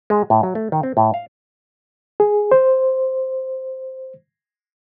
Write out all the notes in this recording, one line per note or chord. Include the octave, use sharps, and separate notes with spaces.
G#3
A2
F#3
A3
D#3
C4
A2
F5
G#4
C5